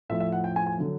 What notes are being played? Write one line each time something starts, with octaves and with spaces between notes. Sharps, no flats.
A2 F3 E5
E5
F#5
G5
G#5
G#5
D3 F#3